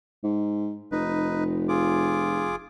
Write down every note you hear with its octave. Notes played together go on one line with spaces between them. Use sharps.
G#2
F1 D#4 B4
F4 G#4 D6